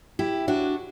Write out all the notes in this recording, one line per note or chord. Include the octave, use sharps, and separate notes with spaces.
E4 G4
D4 F#4